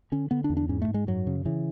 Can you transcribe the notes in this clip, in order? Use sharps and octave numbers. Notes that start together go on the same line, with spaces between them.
D3 C#4
D3 B3
D4
E2
D4
G#2 C#4
A3
G#2
G#3
F#2 F#3
C#3
C#3 E3